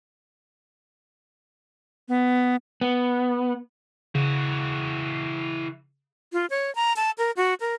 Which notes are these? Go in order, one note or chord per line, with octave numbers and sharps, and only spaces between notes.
B3
B3
C#3 E3 F#4
F4
C#5
A#5
A5
A#4
F#4
A#4